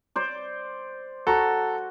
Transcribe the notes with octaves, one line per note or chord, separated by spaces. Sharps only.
C5 D5
F#4 A4 A#5